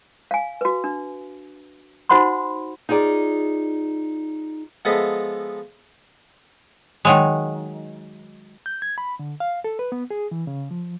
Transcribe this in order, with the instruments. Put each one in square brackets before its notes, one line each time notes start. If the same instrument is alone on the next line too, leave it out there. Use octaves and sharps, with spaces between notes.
[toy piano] F5 G#5
F#4 B4
D4
D#4 F#4 C5 F#5 B5 C6
[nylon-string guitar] D#4 F4 G#4 D5
[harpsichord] F3 G#3 B3 A4 D#5 E5
[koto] D#3 F#3 G#3
[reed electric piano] G6
G#6
B5
D3
F5
A4
B4
B3
G#4
E3
C#3
F3